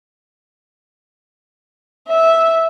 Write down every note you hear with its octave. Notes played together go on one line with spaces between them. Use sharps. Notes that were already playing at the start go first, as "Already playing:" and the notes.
E5